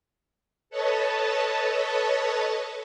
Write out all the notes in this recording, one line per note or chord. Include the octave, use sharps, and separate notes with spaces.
A4 B4 C#5 D#5 A5